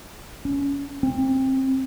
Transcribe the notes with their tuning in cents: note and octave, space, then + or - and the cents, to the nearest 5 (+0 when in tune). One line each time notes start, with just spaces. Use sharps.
C#4 +20
C4 +20